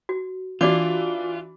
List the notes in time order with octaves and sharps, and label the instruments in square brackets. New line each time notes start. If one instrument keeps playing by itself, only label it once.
[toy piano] F#4
[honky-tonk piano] E3 D4 [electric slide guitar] F4 [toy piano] F#4 D5 D6